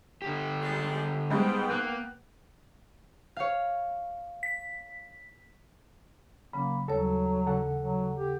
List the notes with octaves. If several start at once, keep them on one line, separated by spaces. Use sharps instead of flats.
D3 G4
G3 G#3
G#2 G3 G#3 B3 G5
A#3 F#6
C#5 F5
B6
C#3 F#3 A#3 C#4 B5
D#2 F#3 G3 A4 C#5
C#3 E3 A4 F#5
F#3
G4